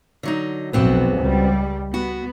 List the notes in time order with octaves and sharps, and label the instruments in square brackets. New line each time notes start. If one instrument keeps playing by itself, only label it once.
[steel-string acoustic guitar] D3 F#3 D#4
[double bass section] F1 B1 [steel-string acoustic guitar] B3 C4 F#4
[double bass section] C#2 G3
[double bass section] B3 [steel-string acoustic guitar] F#4